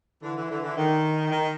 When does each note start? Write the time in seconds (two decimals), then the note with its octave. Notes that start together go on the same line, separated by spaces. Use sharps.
0.23 D3 E3
0.36 D3 E3
0.50 D3 E3
0.63 D3 E3
0.77 D#3
1.31 D#3